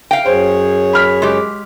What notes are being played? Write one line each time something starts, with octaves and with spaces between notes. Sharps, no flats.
F5 G5
F#2 G#4 C5 C#5
B5 F6 B6
G#3 G4